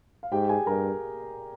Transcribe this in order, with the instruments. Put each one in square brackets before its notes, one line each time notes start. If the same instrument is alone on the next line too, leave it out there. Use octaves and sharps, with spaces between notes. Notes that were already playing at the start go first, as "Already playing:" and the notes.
[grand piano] F5
[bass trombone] G#2 [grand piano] G4 G5
[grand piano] G#4 G#5
[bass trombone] G2 [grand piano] A#4 A#5